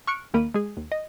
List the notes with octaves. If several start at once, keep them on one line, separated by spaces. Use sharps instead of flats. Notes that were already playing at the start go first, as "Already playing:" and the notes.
C#6 F6 F#6 C#7 D7
D#2 D#3 A#3 A#4 B5 D#7
G#3 G#4
D#2
D#5